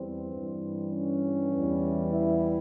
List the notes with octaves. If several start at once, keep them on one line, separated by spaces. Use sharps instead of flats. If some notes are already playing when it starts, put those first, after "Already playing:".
Already playing: E2 E3 G3 C4
G2 E3 G3
C#4
E2 E3 G3
E4